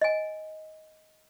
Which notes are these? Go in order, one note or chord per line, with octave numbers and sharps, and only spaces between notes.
D#5 G#5